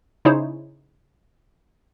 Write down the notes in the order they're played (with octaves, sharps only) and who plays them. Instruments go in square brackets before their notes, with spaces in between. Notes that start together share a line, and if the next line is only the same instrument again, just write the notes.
[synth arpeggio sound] C#3 D#4 E4 G#4 C5 C#5